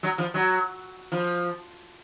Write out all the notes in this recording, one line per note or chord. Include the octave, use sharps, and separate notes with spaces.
F#3
F3
F#3
F3